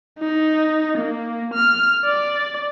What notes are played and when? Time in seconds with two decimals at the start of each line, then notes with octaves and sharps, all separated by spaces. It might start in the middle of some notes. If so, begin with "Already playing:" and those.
0.19 D#4
0.98 A#3
1.54 F6
2.05 D5